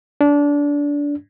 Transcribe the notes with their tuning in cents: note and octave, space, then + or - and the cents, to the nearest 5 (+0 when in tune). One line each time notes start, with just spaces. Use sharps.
D4 -25